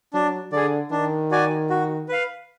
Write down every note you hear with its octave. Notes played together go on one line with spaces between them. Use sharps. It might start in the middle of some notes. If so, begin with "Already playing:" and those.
F#3 D4
D3 G#4 D5
D#3 D4
F#4 D5 G#5
F#4
B4 F5